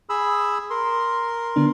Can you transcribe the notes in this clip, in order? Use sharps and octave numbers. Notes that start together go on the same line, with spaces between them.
G#4 B5 E6
A#4 C6
D3 B3 D4